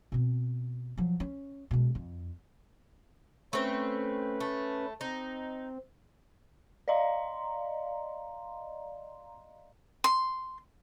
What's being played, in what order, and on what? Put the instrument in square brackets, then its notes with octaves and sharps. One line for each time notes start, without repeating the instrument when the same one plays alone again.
[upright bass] B2 C4
F3 F#3
C#4
B2 G#3
F2
[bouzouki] A3 C4 [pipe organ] C#4 B4
[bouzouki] A3
[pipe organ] C4 [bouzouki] D#4
[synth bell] D5 D#5 F5 A#5 C6
[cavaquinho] C6